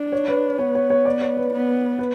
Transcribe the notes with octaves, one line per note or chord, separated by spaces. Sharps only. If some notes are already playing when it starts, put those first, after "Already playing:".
Already playing: D4
C#5
B4
B3 C#5
C#5
C#5
D5
C#5
B4
B3
B4